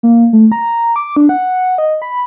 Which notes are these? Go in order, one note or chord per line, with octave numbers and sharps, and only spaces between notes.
A#3
A3
A#5
D6
D4
F#5
D#5
B5